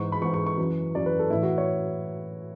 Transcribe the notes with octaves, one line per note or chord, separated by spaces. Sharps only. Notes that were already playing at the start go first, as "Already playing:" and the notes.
Already playing: G#2 E3 C#6
B5
G#2 E3 C#6
C#6
C#6
F#2 E3
F#2 E3 D5
B4
A4
A2 E3 E4
F#4
C#5